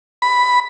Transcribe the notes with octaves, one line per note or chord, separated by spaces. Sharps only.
B5